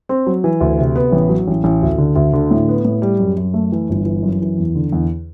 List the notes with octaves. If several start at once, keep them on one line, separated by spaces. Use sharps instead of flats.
C4
F#3
E3
D2
C3
B3
A1
F#3
A1
A1
D2
D3
D2
D3
A2
B3
A2
G3
F#2
F#2
A3
E3
G1
E3
F#2
E3
E2
D3
E2